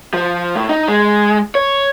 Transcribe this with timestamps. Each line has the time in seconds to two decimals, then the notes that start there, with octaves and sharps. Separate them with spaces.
0.14 F3
0.56 A2
0.69 D#4
0.88 G#3
1.55 C#5